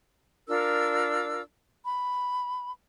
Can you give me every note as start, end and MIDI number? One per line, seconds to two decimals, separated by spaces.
0.48 1.41 62
0.48 1.41 65
0.48 1.41 70
0.48 1.41 88
1.84 2.71 83